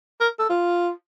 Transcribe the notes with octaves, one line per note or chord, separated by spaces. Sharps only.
A#4
A4
F4